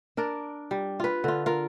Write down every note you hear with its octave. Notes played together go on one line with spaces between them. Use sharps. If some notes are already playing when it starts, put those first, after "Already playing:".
D4 A#4 D5
G3
F4 B4
D3 F4
F4 A#4